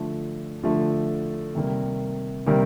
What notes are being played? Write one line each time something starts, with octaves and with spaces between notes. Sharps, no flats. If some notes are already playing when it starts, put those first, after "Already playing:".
Already playing: D3 F3 A3
D3 F3 A3
C3 D#3 G3 A#3
C3 D#3 G3 A#3